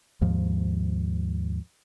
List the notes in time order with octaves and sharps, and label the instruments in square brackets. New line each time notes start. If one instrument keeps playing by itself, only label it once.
[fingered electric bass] D#2 G#2 F3